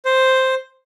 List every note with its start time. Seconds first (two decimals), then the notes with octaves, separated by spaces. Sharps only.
0.05 C5